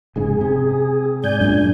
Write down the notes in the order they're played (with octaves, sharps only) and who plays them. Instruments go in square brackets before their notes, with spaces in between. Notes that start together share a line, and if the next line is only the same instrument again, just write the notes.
[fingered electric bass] F1 G#2 C#3 [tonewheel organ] G#4
[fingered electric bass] C3
[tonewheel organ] G#2 G#5 G6 [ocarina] D5
[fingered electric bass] F#2 A#2 [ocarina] D4